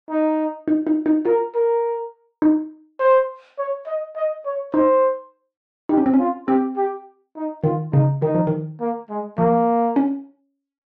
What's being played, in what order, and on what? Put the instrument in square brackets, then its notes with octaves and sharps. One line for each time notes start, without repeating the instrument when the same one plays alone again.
[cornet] D#4
[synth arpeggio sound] D#4
D#4
D#4
[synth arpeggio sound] F4 [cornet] A#4
[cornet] A#4
[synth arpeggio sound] D#4
[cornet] C5
C#5
D#5
D#5
C#5
[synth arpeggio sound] D#4 [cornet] C5
[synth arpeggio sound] D#4 [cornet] G4
[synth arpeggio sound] C#4
C4
C#4
[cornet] F4
[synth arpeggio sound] C4 [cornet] G4
[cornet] G4
D#4
[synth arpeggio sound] D#3 [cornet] F4
[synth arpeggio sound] C#3 [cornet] D#4
[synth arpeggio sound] D#3 [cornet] D#4
[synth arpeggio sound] F3
D#3
[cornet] A#3
G#3
[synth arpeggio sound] F3 [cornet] A#3
[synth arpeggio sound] C#4